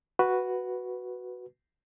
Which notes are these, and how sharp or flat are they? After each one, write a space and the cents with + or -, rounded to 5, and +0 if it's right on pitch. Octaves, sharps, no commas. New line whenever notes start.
F#4 +0 B4 +0